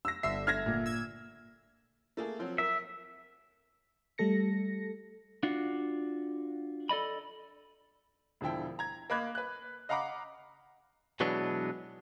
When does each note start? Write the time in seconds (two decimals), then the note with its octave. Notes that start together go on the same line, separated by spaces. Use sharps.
0.05 E6 A#6
0.23 G1 D3 E5 E6 C7
0.47 F6 G#6 A#6
0.66 A#2
0.86 E6 G#6
2.17 A3 A#3 G#4
2.39 F3 F#3 C4
2.58 A#4 E5
4.18 G3 A3 A4 A#6 C#7
5.43 D4 F4 F#4
6.89 A4 D5 D#5 B5
8.41 E1 D3 F3 E4 G5
8.79 A#5 G#6
9.10 A#3 D#5 B5 D6 F#6 G#6
9.35 B4 F#6
9.89 D#5 F5 F#5 A#5 B5 D6
11.20 B2 E3 F#3 G#3 B3 D4